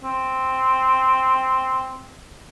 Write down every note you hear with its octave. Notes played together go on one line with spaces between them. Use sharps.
C4